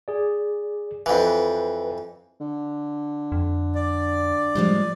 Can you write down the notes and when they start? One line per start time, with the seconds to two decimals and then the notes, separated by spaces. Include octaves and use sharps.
0.08 G#4 D5
1.06 F2 E3 B4
2.41 D3
3.32 F2
3.75 D5
4.55 A2 F3 G3 G#3